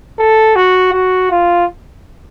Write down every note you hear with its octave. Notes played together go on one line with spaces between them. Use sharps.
A4
F#4
F#4
F4